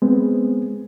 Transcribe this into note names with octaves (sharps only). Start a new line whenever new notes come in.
G#3 B3 C4